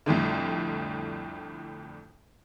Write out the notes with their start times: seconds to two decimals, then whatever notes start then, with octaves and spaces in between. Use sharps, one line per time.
0.06 C2 F2 A2 D3